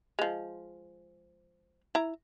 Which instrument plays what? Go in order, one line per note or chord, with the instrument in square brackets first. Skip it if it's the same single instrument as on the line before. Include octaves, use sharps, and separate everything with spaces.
[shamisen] F3 G#3
E4 A#5